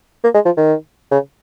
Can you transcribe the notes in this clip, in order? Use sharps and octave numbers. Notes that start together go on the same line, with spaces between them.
A#3
G#3
F3
D#3
C#3